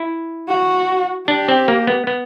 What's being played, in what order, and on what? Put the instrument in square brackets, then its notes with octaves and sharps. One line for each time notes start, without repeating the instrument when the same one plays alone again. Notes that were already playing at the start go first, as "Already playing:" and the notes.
Already playing: [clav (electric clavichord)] E4
[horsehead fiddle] F#4
[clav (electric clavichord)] D4 [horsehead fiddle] G4
[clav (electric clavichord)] C4
A#3
B3
B3